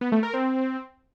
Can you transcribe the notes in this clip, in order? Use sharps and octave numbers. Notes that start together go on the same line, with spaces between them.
B3
A3
A#4
C4